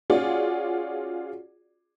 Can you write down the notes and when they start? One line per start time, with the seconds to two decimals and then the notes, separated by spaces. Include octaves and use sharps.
0.10 C#4 F4 F#4 G#4 D5